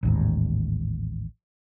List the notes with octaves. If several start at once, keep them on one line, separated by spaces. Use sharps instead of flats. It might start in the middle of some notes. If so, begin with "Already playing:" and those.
A1 D#2 G#2